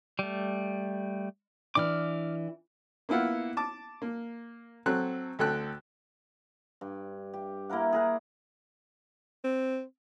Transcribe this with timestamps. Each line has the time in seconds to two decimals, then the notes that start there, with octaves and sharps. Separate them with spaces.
0.19 G3 A3
1.75 E3 D4 D6 F6
3.09 A#3 B3 E4 F4 F#5
3.57 A5 D6
4.02 A#3
4.86 F#3 C4 A4 F#6
5.39 D2 A4 G5 F#6
6.81 G2
7.34 G4
7.69 A#3 E4 A#4 F#5
7.93 G#4 A#4 F#5
9.44 C4